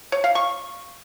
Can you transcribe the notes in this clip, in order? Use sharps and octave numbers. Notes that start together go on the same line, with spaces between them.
C#5
F5
C#6